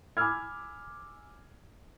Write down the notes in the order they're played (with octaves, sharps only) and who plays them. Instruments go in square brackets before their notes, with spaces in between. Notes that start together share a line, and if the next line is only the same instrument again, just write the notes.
[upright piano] G#5 B5 D6 E6 F6 G#6